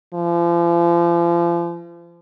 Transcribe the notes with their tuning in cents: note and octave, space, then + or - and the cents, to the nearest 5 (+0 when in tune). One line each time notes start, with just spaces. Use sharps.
F3 -35